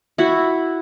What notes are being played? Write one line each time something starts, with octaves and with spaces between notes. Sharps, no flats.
E4 F#4